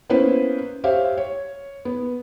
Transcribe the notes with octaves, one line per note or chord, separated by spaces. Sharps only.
A#3 B3 C#4 E4 B4 C5
G4 C5 C#5 E5 F5
C#5
B3